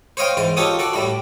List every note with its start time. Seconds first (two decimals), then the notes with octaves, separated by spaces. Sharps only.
0.17 C5 C#5 D#5 F5 G5
0.37 G#2 E3 C5
0.57 D#4 F4 G4 A4 C#5 D#6
0.79 F#4 A4 D5
0.93 A2 G3 E4